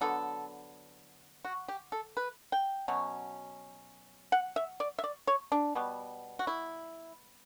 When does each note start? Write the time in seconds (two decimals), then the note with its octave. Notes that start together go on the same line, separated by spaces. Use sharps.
0.01 D3 F#3 B3 A4
1.45 F#4
1.68 G4
1.92 A4
2.17 B4
2.52 G5
2.88 B2 F#3 C#4
4.32 F#5
4.56 E5
4.80 D5
4.99 E5
5.04 D5
5.27 C#5
5.52 D4
5.75 B2 G3 B3
6.39 F#4
6.47 E4